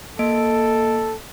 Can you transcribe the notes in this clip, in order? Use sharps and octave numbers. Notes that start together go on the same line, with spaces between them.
A#3 A4 D#5 D7